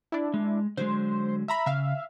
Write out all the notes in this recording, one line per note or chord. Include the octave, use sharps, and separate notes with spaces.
D4 E4
G#3
D3 F#3 G#3 C5
E5 A#5 B5
C#3 E5 F5